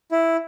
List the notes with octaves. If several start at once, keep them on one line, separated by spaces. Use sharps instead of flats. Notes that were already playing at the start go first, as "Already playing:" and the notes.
E4